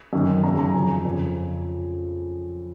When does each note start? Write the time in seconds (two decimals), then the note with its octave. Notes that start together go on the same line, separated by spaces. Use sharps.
0.13 F#2 D#3
0.43 F#2 C#3 A#5
0.59 A#5
0.74 F2 C#3 G#5
1.05 F2 C#3